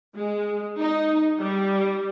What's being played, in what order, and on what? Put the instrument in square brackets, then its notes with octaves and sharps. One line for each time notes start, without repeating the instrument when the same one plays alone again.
[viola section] G#3
D#4
G3